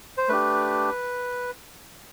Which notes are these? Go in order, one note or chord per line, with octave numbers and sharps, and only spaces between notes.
C5
A3 D4 G4 B4